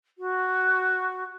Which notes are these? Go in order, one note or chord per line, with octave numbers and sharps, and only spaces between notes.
F#4